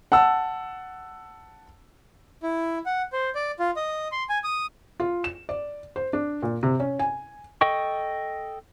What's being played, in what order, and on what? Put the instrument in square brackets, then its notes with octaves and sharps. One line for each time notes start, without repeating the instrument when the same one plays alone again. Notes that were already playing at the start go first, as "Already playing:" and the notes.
[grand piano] F#5 A5 E6
[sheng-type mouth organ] E4
F#5
C5
D5
F4
D#5
C6
G#5
D#6
[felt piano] F4
E7
D5
C5
D4
A#2
C3
C#4
G#5
[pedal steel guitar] A4 D#5 G5 C#6